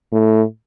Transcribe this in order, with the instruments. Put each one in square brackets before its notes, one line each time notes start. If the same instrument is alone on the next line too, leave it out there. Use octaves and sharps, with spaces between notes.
[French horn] A2